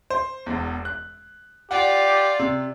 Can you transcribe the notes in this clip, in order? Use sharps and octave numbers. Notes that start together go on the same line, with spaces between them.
C5
E1 E2
F#6
F4 G4 D5 F#5
C3